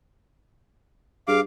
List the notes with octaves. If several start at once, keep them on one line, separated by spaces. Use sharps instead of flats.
G2 G#4 F5 D6